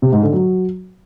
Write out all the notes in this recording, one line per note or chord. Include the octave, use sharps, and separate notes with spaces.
C3
G#2
D3
F#3